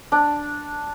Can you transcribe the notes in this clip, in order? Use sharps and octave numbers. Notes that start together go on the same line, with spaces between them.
D4